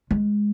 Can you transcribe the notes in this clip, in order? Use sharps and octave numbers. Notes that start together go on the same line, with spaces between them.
G#3